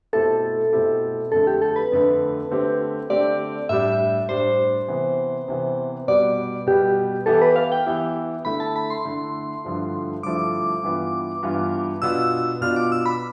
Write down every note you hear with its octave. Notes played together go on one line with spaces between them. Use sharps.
B2 A3 C4 E4 G4 A4
B2 A3 C4 E4 G4
F2 D3 A3 A4
G4
A4
B4
F2 D3 A3
D3 A3 C4 G4
D3 A3 C4 G4 D5
A2 G3 D4 G4 E5
A2 G3 D4 G4 C5
C3 E3 B3
C3 E3 B3
B2 G3 B3 D5
B2 G3 B3 G4
E3 B3 E4 G4 A4
B4
F5
G5
E3 B3 E4 G4
D3 A3 E4 B5
A5
B5
C6
D3 A3 E4
G2 D3 F3 A3 E4
G2 D3 F3 A3 E4 D6
G2 E3 B3 F4
G2 E3 B3 F4
B2 B3 D4 F4 E6
B2 B3 D4 F4 F6
D6
E6
B5